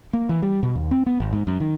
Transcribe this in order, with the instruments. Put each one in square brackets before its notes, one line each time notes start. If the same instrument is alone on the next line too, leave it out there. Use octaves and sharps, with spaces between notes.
[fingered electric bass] A#3
E3
G3
B2
D#2
C4
B3
G#1
G#2
F#2
D#3